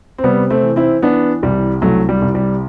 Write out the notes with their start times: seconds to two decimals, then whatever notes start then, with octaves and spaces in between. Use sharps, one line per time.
0.18 C4
0.24 C3 G3 B3
0.50 A3 C4
0.63 E3
0.76 C4 E4
1.02 E3 B3 D4
1.43 C2 G3
1.82 C2 F#3 A3
2.09 G3
2.22 C2
2.35 G3